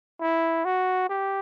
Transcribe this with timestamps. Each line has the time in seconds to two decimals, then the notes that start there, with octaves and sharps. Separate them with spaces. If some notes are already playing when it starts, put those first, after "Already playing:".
0.21 E4
0.65 F#4
1.10 G4